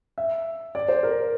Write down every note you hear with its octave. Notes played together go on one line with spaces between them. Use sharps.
E5
D5
C5
A#4